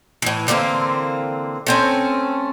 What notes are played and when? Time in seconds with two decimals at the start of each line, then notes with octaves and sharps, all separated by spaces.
0.22 A2 E3
0.48 D3 E3 A#3 C4
1.67 A3 C4 C#4